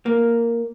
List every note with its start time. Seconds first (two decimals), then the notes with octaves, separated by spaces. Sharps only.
0.06 A#3